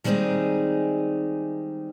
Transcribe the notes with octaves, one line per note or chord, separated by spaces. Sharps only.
D#3 G3 G#3 C4 D#4 G#4